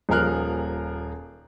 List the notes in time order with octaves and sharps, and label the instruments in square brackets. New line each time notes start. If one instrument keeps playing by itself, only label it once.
[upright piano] D#1 F3 G#4 A#4 F6 F#6